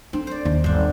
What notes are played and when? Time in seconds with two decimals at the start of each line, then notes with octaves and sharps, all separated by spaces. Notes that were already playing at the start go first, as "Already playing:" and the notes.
0.13 C4 D4
0.27 C5 D5
0.45 D#2 D4
0.64 G1 D4 C5